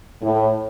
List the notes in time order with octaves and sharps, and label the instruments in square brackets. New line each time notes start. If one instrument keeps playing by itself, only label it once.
[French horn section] A2